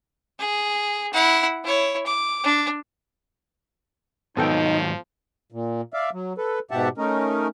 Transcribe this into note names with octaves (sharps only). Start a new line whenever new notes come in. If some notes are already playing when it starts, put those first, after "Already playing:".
G#4
E4 F#5
E4 C#5
D6
D4
G#2 D#3 F3 F#3 B3 D#4 A4 G5
A#2
D5 E5 F5
F#3
A4 B4
G#2 B2 G4 E5 F#5 A5
A3 C#4 D#4 A#4